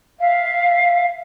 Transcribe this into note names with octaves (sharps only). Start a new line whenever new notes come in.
E5 F5